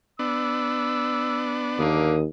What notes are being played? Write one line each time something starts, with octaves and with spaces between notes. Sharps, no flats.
B3 D4 E6
D#2 D3 A#3 D#6